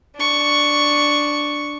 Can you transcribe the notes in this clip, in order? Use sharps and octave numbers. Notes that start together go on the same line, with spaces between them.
D4 C#6